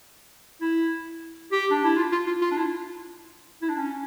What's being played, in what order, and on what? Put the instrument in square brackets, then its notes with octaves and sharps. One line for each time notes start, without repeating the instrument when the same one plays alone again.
[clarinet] E4
G4
D4
E4
F4
F4
F4
F4
D4
E4
E4
D4
C#4